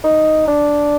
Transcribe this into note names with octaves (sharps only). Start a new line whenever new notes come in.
D#4
D4